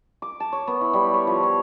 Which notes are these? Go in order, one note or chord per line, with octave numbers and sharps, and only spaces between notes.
D6
A5
C#5
B3
E4
G3
C#5
F3
C#5